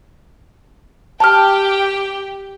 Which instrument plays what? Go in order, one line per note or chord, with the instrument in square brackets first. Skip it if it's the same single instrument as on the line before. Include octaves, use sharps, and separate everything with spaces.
[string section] G4 G5 [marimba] A5 F6